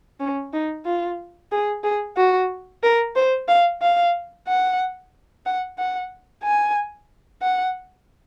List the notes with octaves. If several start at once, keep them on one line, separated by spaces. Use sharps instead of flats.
C#4
D#4
F4
G#4
G#4
F#4
A#4
C5
F5
F5
F#5
F#5
F#5
G#5
F#5